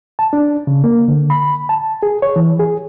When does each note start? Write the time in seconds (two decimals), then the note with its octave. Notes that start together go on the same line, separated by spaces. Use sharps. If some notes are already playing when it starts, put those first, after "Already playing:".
0.19 A5
0.33 D4
0.67 C#3
0.84 A#3
1.08 D3
1.30 B5
1.69 A5
2.03 G#4
2.22 C#5
2.36 E3
2.59 G#4